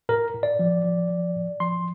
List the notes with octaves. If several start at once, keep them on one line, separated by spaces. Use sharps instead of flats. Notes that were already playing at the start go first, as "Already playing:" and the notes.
A2 A#4
A2
D5
F3
F3
F3
A2
F3 C6